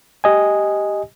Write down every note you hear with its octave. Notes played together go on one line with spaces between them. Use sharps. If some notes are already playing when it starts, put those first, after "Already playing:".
G4 D#5 G#5